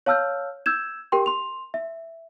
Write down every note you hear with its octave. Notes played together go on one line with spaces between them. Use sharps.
C#5 F5 A5 E6 F6 G6
E6 G6 G#6 E7
G4 A#4 G5 C6
C6 F7
E5